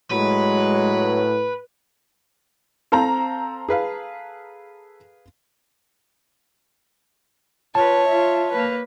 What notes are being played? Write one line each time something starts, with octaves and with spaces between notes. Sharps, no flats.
A2 F#3 G#3 B4
C4 A4 C5 F5 A#5
G#4 B4 F5
F4 B4 C#5 A5
F4 E5
A#3 B4